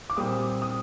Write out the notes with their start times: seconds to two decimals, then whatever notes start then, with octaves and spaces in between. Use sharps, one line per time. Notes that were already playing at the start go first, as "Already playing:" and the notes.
0.10 D6
0.17 A#2 G3 C4 D#6
0.62 D#6